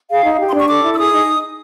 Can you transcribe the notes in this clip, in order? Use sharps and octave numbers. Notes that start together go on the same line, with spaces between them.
G#4 F5
D#4
G4
C6
D4 C#6
A4 D6
E4
E6
G#4 D#6
D#4